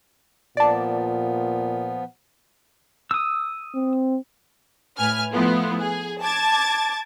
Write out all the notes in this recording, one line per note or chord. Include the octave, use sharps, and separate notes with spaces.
A#2 F3 B3 D5 A5
D#6 E6
C4
A2 B4 G#5 F6
F3 A3 B3 E4 F4
G#4
A5 D6 G#6 A6